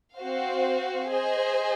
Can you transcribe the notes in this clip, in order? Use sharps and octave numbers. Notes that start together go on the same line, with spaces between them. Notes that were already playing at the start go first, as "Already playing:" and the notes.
C4 F#4 C5 F5
G#4 C5 D#5